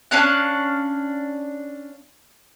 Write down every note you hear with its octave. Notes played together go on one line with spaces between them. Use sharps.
C#4 D4 F5 F#6